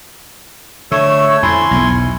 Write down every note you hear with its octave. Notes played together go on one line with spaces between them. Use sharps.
D3 A3 C#5 E6
F2 E4 G#5 C6
B1 E2